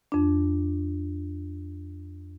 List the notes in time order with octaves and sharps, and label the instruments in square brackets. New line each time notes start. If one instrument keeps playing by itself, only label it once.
[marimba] F2 D4